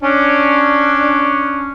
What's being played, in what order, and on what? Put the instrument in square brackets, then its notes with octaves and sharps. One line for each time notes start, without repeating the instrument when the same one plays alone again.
[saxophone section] C#4 D4